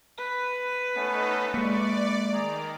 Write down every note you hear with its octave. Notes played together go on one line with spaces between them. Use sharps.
B4
A3 B3 C#4 D#4 A4
G#3 A#3 D5 C#6
D#3 G#4 A#5